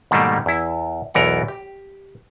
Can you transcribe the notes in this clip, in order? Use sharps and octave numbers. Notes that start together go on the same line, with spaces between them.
G#2 B2 D#3 G3 A3 A#3
E2 E4
B1 E2 E3 A#4 F#5
G4